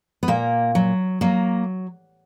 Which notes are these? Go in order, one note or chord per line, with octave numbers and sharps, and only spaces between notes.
B3
A#2 A#3
F#3
F#3 A#3